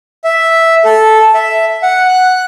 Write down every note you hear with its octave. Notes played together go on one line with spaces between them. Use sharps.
E5
A4
E5
F#5
F#6